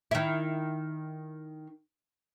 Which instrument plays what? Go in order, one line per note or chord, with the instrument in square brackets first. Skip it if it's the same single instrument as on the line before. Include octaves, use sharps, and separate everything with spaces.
[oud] D#3 E4